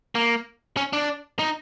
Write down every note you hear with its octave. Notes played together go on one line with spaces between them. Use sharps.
A#3
C#4
D4
D#4